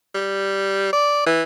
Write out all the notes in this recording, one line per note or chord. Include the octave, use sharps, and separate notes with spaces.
G3
D5
E3